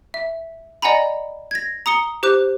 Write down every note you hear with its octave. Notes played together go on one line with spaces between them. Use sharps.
E5
D5 D#5 F#5 G#5 A#5 B5
G#6 A#6
A#5 D#6 C#7 G7
G4 C5 D6 F#6